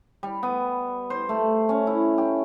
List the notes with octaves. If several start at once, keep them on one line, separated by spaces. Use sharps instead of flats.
G3
B3
C5
A3
C#4
E4
G4